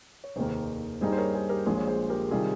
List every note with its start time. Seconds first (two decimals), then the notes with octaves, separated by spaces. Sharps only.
0.24 C#5
0.36 F1 D#2 D#3 A#3 G#4 C5
1.01 G2 G3 A#3 D#4 G#4 C5
1.12 C5
1.17 A#4 C#5
1.34 G#4 C5
1.49 G4 A#4
1.66 A#1 A#2 G#3 G#4 C5
1.78 C#5
1.87 G#4 C5
2.09 G4 A#4
2.31 C3 D#3 G3 F4 G#4